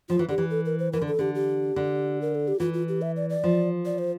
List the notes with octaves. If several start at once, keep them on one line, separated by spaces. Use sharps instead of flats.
F3 F4
E3
D3 G4
E3
A4
A#4
C5
E3 A#4
D3
A4
D3 G4
G4
D3
A#4
A4
G4
E3 F4
F4
G4
E5
D5
D5
F3
D5
C5